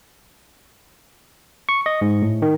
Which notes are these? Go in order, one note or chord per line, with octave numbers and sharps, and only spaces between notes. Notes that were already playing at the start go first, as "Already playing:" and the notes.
C#6
D#5
G#2
A2
D#3